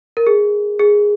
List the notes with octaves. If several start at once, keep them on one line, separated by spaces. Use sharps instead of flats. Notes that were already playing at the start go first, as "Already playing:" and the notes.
A#4
G#4
G#4